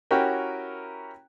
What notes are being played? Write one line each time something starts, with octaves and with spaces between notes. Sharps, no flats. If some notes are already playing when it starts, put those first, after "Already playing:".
C#4 E4 F#4 G4 A#4 G5